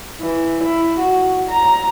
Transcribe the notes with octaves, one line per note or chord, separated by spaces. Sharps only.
E3
E4
F#4
A#5